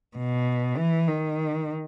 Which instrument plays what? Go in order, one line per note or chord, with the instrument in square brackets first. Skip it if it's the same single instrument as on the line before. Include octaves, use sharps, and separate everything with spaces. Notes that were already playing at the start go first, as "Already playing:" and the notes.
[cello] B2
E3
D#3